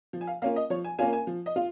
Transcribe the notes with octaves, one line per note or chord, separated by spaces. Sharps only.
F3
G#5
F5
A#3 C#4 F4 F5
D#5
F3 C#5
G#5
A#3 C#4 F4 G#5
G#5
F3
D#5
F4